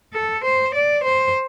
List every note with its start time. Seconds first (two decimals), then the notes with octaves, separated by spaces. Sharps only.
0.14 A4
0.44 C5
0.75 D5
1.04 C5